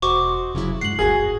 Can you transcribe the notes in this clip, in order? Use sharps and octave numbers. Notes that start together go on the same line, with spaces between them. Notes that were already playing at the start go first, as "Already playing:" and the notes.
E1 F#4 C5 D#5 C#6 D6
F1 C#3 F#3 E4
E2 G2 G#3 F#5 C7 F#7
D1 G1 F#4 G#4 G#6 A#6